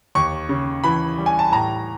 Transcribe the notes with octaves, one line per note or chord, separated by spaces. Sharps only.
D#2 C#6
C#3
E3 B5
G3
G#5
A5
A2 A#5